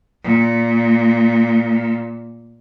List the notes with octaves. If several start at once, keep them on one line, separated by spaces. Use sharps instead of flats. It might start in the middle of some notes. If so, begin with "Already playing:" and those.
A#2